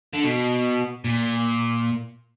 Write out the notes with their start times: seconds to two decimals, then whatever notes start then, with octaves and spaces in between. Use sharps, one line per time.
0.13 D3
0.24 B2
1.04 A#2